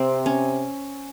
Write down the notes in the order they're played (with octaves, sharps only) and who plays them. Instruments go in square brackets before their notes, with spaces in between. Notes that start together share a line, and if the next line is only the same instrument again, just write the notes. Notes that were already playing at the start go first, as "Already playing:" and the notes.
Already playing: [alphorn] C3 [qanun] C4
[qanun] C#4